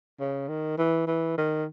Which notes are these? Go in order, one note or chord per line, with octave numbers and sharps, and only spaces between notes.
C#3
D#3
E3
E3
D#3